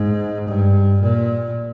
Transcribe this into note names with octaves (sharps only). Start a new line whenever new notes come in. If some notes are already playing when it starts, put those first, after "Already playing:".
Already playing: G#2
G2
A#2